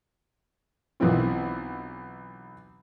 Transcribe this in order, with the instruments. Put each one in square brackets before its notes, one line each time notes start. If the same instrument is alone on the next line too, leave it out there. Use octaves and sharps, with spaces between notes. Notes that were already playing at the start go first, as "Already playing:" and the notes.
[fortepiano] B1 E3 B3 C4 F4